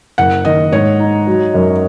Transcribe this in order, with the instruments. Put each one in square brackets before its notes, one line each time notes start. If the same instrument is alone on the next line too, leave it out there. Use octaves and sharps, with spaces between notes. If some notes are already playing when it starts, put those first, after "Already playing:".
[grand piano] F#1 [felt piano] F#5
[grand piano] D#3 [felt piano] D#5
[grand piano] G#2 [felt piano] C#5
[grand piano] D#4
F#3
F#2